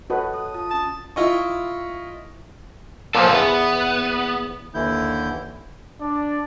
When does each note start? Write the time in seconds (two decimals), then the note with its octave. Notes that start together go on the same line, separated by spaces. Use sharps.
0.10 F#4 A4 B4 C#5 D#5 A5
0.34 D#6 F#6
0.54 F4 A5
0.71 C#4 A5 A6
1.16 E4 F4 D#5 C#6
3.15 A#2 F3 B3 C#4 A4
3.33 E2 B3
4.74 D#2 D3 E3 E4 G6
6.01 D4 D5